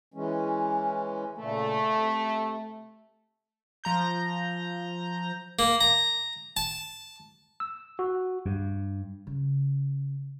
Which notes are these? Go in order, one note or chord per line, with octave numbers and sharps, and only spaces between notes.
E3 G#3 C#4
A#2 C#3 A3
C3
F3 A#5 G6
A#3
A#5
A5
E6
F#4
G2
C#3